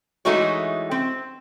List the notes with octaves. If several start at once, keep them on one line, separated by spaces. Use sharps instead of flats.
E3 G#3 A3 D#4 F#4 C#5
C4